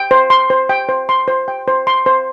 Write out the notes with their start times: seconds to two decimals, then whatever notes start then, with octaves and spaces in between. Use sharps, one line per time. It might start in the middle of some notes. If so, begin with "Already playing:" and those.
Already playing: G5
0.11 C5
0.30 C6
0.50 C5
0.69 G5
0.89 C5
1.09 C6
1.28 C5
1.48 G5
1.68 C5
1.87 C6
2.06 C5